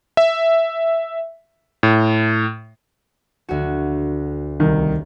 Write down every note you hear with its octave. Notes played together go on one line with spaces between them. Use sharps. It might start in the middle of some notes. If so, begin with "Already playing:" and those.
E5
A2
D2 F#4
C2 D#3